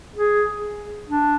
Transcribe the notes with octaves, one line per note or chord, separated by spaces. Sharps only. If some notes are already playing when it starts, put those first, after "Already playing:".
G#4
D4